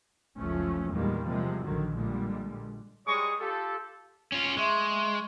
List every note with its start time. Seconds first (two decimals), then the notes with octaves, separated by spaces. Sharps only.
0.37 F#1 C#2 F3 A3 C#4
0.91 E2 A#2 D#3 G3 G#3 A#3
1.26 C3 F3 G#3
1.63 A#1 D3 D#3 F#3
1.95 A#2 D3 G3 G#3
3.07 G3 G#3 C#5 C#6 D#6
3.40 F4 G4 A4
4.32 C#4 F4
4.57 G#3 E5 C6 C#6